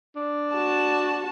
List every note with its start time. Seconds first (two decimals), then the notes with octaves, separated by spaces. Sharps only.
0.16 D4
0.54 F#4 A5